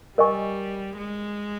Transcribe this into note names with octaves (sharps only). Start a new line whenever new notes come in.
G3 A#4 D#5 G#5 C#6
G#3